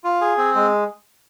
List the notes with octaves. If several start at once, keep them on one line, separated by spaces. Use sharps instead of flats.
F4
G#4
C4
G#3